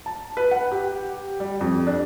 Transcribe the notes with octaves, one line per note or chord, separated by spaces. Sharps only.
A5
B4
F#5
G4
G3
F2
D4